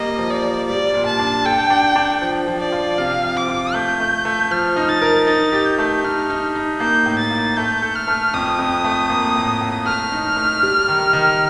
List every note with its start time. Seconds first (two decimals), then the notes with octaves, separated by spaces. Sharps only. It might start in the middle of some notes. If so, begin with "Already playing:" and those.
Already playing: G3 A#3 D#5
0.18 F3
0.30 D5
0.43 F3
0.68 G3 D5
0.94 A#2
1.06 A5
1.19 D4
1.45 A4 G5
1.70 D4
1.96 D4
2.22 F3
2.47 F3
2.60 D5
2.72 F4
2.98 C3 F5
3.24 F3
3.37 D6
3.48 F4
3.74 A3 G6
4.00 A3
4.25 A3
4.51 F3 F6
4.76 D#4
4.89 A6
5.02 A#4
5.27 D#4 A6
5.52 G4
5.66 G6
5.78 A3
6.04 D#4 F6
6.30 D#4
6.55 D#4
6.80 A#3 G6
7.06 A2
7.19 A6
7.31 A#3
7.57 A3 G6
7.82 A4
7.96 F6
8.08 A3
8.34 F2 D#6
8.59 F2
8.84 A3
9.10 A#3
9.36 A2
9.61 A2
9.86 A3 F6
10.12 D#4
10.37 A3
10.63 G3
10.88 D#3
11.13 D#3